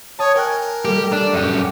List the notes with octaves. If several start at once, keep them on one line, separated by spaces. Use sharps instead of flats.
C#5 A5 D#6
A#4 G5 G#5 F#6
G3 A3 A#3 G4
D4 D#7
F#2 G4